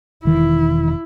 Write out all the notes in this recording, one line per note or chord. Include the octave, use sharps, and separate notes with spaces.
E1 D#3 E3 E4